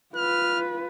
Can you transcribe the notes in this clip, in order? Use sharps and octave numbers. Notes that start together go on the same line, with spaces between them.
F4 B4 F6